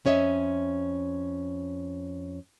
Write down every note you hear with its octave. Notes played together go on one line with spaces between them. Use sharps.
F2 C#4 C#5 D#5 E5